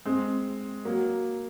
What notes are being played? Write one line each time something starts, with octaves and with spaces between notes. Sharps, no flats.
G#3 C4
F#3 A#3